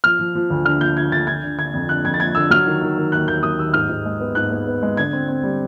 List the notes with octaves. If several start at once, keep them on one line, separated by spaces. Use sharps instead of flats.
F3 F6
F3
F3
D2
D3 F6
F3 G6
D3 G#6
D2 A6
D3 G#6
D3
D3 G#6
F2
D3 F#6
F2 G#6
A6
F3 G#6
D3 E6
F#3 F6
D#3
D#3
D#3
D#2 F#6
D#2 G6
F#3 D#6
D#2 E6
G#2 F6
G#2
G#3
B3
G#2 F#6
B3
B3
G#3
D3 G#6
C4
C4
G3